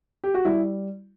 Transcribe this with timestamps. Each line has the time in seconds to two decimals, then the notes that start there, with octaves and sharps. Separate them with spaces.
0.24 G4
0.34 F#4
0.45 G3 E4